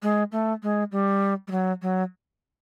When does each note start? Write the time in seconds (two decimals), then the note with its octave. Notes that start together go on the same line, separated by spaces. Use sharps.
0.03 G#3
0.32 A3
0.63 G#3
0.92 G3
1.48 G3
1.51 F#3
1.82 F#3